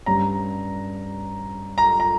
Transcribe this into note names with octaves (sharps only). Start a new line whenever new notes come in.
G2 G3 C#4 A#5
A#5
A#5